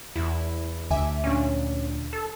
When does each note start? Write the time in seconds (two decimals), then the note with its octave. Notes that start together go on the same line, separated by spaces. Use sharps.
0.16 E2 E4
0.90 D2 E5 G#5 D6
1.24 A#2 C#4 D4
2.13 A4